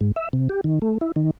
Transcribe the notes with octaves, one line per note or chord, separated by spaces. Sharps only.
G#2
E5
C3
G4
D#3
A3
E4
D#3